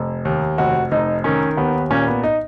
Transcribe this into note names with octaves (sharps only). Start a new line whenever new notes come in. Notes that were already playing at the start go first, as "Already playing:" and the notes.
Already playing: F1
D#2
F1 F#4
F1 D#4
D#3 C#4
D#2 B3
A#2 C#4
B3
D#4